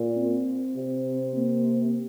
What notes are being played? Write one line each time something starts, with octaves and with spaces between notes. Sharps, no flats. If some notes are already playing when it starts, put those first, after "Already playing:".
Already playing: A#2
C4
C3
A#3